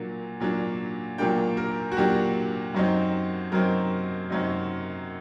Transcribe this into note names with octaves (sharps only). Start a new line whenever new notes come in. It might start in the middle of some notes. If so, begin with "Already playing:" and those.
Already playing: A#2 F#3 A#3 D4
A#2 F#3 A#3 D4
A#2 F#3 A#3 D4 G5
A#4
F#4
A#2 F#3 A#3 D4 G4
F#2 F#3 C4 D#4
F#2 F#3 C4 D#4 A#4
F#2 F#3 C4 D#4